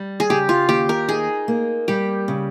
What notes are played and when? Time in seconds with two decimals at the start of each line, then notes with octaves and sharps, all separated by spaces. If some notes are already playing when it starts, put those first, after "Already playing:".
Already playing: G3
0.20 G#4
0.30 C#3 G4
0.49 F4
0.69 D#2 G4
0.89 A#4
1.09 D#4 G#4
1.48 A#3
1.88 G3 G4
2.28 C#3